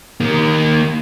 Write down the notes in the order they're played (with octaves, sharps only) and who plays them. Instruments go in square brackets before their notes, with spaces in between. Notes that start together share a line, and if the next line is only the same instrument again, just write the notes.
[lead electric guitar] D#3 A#3